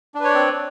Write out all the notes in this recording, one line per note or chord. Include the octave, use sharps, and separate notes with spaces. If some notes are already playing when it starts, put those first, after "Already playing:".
C4 D4 B4 C#5 D5